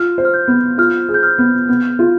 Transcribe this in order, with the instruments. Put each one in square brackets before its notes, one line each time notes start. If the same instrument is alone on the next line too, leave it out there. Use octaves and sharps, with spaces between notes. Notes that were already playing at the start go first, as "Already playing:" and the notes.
Already playing: [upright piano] F4 [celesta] F6
[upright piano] C5
[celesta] F6
G6
[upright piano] B3
[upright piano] F4 [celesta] F6
[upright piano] G#4
[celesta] G6
F6
[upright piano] B3
B3
F4